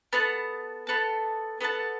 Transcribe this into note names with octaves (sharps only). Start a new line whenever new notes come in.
B3 A4 F#5 A5
B3 A4 F#5 A5
B3 A4 F#5 A5